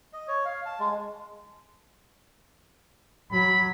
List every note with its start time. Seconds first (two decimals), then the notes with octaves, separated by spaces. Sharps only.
0.13 D#5
0.28 C#5
0.45 F5
0.66 A5
0.80 G#3
3.32 F#3 B5